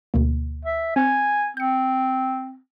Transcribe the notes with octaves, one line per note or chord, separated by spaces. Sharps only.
D2 B2 A#3
E5
C4 G#5 F#6
C4 G6 C#7